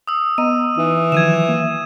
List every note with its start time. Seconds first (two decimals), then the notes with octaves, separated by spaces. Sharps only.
0.07 D#6 E6
0.38 B3 D#5 A#5 D#7
0.77 E3 D#4
1.12 D#3 F3 F#3 G#6 D#7 E7
1.49 A#3